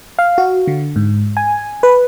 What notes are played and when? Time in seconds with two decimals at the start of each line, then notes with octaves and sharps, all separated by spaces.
0.19 F5
0.38 F#4
0.67 D3
0.96 G#2
1.37 G#5
1.83 B4